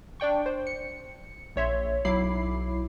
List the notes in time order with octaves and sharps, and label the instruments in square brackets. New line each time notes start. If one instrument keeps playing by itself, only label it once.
[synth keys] D4 D5 G5 C#6
C5
C#7
A#1 C#5 E5 C6
B1 F#3 E4 B5 D6 C7